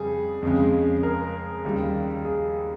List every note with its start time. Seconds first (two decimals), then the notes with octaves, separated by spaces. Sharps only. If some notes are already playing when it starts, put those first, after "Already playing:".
Already playing: F2 C#3 G3 G#4
0.43 F2 C#3 G#3
1.03 A#4
1.64 D#2 C#3 G3
2.25 G#4